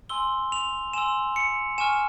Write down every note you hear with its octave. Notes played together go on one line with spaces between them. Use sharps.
G#5 C6 E6 G7
F7
G#5 C6 E6 E7
C#7
G#5 C#6 F6 E7